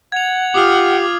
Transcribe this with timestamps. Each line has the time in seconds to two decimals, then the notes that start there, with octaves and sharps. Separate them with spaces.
0.12 F#5 G#6 F7
0.54 F4 G4 D6 D#6 F6